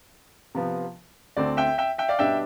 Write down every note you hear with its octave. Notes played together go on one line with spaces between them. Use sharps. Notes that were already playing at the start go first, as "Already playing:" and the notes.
C3 F3 B3
D2 D3 A3 C4 D5
E5 G5
E5 G5
E5 G5
D5 F5
B2 G3 D4 E5 G5